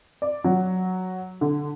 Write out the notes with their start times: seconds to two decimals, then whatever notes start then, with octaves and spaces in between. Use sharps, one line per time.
0.22 D5
0.44 F#3
1.41 D3